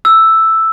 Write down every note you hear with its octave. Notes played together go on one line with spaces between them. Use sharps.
E6